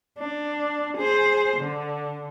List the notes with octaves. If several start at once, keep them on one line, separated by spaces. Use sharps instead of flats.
D4
G#4 C5
D3